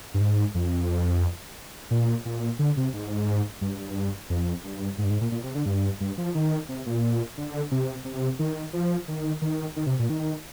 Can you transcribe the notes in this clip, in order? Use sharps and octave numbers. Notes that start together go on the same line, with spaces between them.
G2
G#2
F2
A#2
A#2
D3
C3
G#2
G2
F2
G2
G#2
G2
G#2
A#2
A#2
C3
D3
G2
G2
F3
D#3
C3
A#2
D3
C3
C3
D#3
F3
D#3
D#3
D#3
C3
A#2
D#3